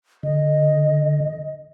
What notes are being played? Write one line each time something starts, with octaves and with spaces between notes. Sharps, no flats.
D3 D#5